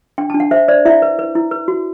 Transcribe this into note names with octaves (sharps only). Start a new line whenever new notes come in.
D4 G5
D4 A5
F#5
C5 E5
C5 D5
E4 E5
B4
B4
E4
B4
F#4